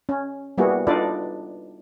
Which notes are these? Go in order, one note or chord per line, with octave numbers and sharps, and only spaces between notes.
C#4
G3 A#3 B3 E4 F#4 G#4
D4 D#4 F4 A4 B4 D5